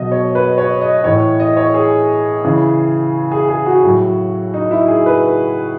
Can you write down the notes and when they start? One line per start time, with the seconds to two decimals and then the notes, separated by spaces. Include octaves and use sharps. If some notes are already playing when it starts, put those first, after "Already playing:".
Already playing: B2 F#3 D#5
0.12 C#5
0.35 B4
0.58 C#5
0.81 D#5
1.04 A2 E3 C#5
1.40 D#5
1.57 C#5
1.74 G#4
2.44 C#3 E3
3.31 G#4
3.48 G#4
3.66 F#4
3.83 A2 F#3
4.54 D#4
4.71 E4
4.88 G#4
5.06 B4